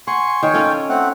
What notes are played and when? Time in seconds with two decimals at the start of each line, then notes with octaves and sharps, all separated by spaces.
0.07 F#5 G#5 C6 C#6
0.43 D#3 C#5 G5 G#5
0.54 C#4 F4 A4
0.89 A3 C4 F#5